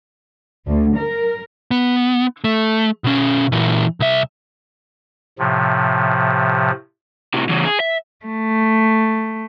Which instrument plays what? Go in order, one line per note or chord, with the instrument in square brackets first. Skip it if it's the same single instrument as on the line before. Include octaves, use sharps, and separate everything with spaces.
[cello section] D2
A#4
[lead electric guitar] B3
A3
B2 C#4
A#2 E3
C2 E5
[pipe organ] A2 C3 F3
[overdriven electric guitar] A2 C3
E2 C#3
G#4
E5
[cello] A3